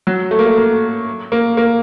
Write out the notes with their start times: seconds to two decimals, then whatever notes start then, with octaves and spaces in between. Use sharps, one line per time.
0.07 F#3
0.31 A3
0.39 A#3
0.46 A3
0.57 A#3
1.32 A#3
1.57 A#3